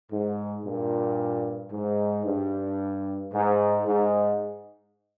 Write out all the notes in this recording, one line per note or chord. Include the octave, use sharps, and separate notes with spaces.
G#2
G2 A#2
G#2
G2
G#2
G#2